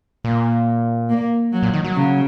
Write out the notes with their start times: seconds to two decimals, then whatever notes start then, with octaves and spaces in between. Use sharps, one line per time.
0.24 A#2 A#3
1.09 A#3
1.53 F#3
1.63 A#2
1.73 D#3
1.84 F#3
1.95 C#3